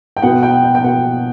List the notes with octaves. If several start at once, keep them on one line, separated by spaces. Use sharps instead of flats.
G5
B2 F#5
G5
G5
G5
B2 F#5